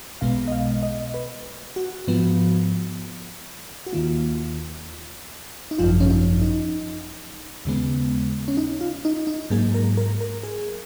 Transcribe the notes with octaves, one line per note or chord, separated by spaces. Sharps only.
B1 B2 G#3 B3 F5
D#5
F5
D#5
B4
F#4
G#2 F3 B3
F#4
D#2 D#3 A#3 F4
D#4
G#1 F#2 F3 F4
C#4
D#4
D#4
D#2 C#3 G#3 B3
C#4
D#4
F4
D#4
D#4
G#2 F#3 A#3 G#4
A#4
A#4
A#4
G#4